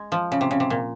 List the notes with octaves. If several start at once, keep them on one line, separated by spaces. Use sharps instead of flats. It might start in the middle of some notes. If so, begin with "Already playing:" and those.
Already playing: G#3
F3
C#3
C3
C#3
C3
A#2